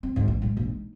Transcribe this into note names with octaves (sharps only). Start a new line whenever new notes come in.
C4
D2 G#2
A#1
A2 G#3
A#1 G#3
D#4